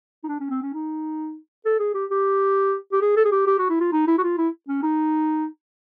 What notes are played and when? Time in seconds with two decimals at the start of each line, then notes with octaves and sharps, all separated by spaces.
0.24 D#4
0.28 D4
0.40 C#4
0.50 C4
0.62 C#4
0.73 D#4
1.65 A4
1.80 G#4
1.94 G4
2.11 G4
2.92 G4
3.01 G#4
3.17 A4
3.25 G#4
3.32 G4
3.47 G4
3.59 F#4
3.70 E4
3.81 F4
3.92 D#4
4.07 E4
4.18 F#4
4.23 F4
4.38 E4
4.68 C#4
4.83 D#4